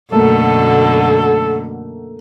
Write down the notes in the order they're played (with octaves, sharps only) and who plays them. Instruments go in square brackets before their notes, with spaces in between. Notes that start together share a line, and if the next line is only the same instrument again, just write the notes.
[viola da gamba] F#2 B2 D3 [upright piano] A3 A#3 [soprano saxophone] A4